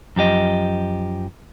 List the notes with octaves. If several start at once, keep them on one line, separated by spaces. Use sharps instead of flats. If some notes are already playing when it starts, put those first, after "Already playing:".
F#2 F3 G4 D#5